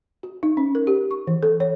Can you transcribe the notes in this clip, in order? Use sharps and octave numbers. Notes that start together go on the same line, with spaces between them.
F#4
D#4
C#4
A#4
G4
C#6
E3
A4
C#5